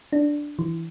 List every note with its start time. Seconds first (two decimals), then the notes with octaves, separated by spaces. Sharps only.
0.12 D4
0.59 E3